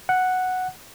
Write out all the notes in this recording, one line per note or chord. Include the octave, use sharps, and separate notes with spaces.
F#5